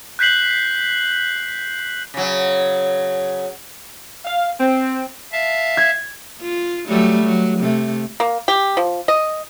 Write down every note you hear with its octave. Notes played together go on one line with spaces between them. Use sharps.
F#6 G6 B6 C7 F#7
C#3 F#3
F5
C4
E5 F5 A5
G#6
F4
F#3 G3 A3
F#3
C3 A3
A#3
G4
F3
D#5